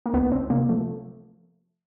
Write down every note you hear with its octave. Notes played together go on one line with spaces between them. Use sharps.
A#3
C#2 B3
C#2 C4
C3 A#3
F3 A3